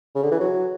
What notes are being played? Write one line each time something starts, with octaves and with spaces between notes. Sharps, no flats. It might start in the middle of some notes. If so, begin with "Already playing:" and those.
C#3
D3
E3
F#3